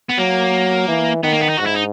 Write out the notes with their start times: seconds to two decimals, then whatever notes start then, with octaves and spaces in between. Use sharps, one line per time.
0.10 B3
0.18 F#3 A#3
0.88 E3
1.23 D#3 B3
1.32 A#3
1.41 B3
1.50 D#4
1.58 G#2 F#4
1.67 E4
1.75 D#4